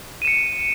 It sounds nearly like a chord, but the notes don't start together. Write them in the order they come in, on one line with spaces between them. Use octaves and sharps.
D#7 E7 C#7